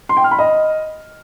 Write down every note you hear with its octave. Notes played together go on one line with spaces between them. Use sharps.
C6
G5
F6
B5
D#5